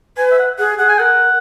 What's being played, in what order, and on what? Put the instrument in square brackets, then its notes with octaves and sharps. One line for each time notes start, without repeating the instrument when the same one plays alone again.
[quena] B4 [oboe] G#5
[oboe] E5
F#5
[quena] G#4 [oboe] F#5
[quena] G#4 [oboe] F#5
[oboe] G#5
[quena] A#4 [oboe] F#5